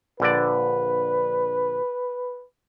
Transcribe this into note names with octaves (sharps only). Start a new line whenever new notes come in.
A#1 D3 B4 D5